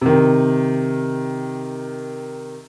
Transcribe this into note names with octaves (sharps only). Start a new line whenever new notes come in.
C3 D#3